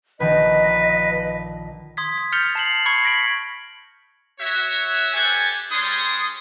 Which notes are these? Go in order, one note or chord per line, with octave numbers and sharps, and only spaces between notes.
A#1 D#3 B4 D#5
C6 D#6 G#6 B6
B6
F6 G6 A6 C#7 F7 G7
A5 C7 F#7
B5 C#6 G#6 C7 C#7
A#6 B6 D7 F#7
F#4 C#5 E5
G4 A4 C5 F#5 G#5
G3 D4 G#4 C#5 C6 D#6